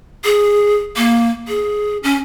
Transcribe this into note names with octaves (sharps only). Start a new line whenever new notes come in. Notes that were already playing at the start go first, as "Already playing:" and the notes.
G#4
A#3
G#4
C#4